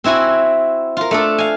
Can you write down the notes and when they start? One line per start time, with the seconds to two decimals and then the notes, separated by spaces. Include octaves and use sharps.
0.04 C4 E4 F#4 G#5
0.97 F4 A#4
1.11 A3 D4 A4
1.38 F5 G#5